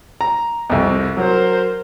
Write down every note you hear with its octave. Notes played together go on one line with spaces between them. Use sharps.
A#5
C2 F2
F#3 A#4 C5